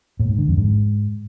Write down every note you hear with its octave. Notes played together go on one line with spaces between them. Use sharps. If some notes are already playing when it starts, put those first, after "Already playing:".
A2
G#2
D3
F2
G#2